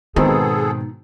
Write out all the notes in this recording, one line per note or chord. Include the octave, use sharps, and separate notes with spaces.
G#2 B2 D#3 B3 C4 D#4 G#4 A4